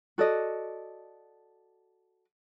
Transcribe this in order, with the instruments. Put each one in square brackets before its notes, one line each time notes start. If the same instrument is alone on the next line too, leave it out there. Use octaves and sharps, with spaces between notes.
[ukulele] F#4 A4 D5 D#5